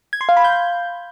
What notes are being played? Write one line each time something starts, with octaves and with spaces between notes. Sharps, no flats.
G#6
C6
F5
B5
G6